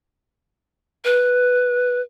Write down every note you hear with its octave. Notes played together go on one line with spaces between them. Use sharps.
B4